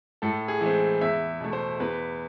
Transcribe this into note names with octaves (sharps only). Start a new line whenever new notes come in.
A2 A4
G#4
E3 G#3 C4
E2 E5
B2 A3
C5
E2 B4